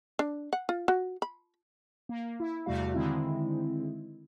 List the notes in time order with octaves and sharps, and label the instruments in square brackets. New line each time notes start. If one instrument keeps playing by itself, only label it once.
[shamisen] D4
F#5
F4
F#4
B5
[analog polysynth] A#3
E4
E2 C3 G3 A3 F#4 F5
D3 D#3 G#3 C4 E4